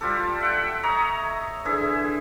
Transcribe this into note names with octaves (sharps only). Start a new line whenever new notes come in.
G3 F4 G4 A4
E5 F#5 G5
C#5 D#5 E5 A#5
D3 E3 G#4 E5